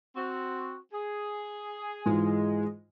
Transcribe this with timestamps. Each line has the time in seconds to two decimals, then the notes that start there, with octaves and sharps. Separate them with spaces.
0.16 C4 F#4
0.92 G#4
2.06 G#2 E3 G#3 F4